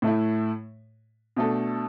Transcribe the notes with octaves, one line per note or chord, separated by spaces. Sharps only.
A2 A3 E4
B2 A3 D4 A4